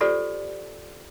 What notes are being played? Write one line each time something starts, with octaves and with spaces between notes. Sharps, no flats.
F4 G4 A4 C5 D5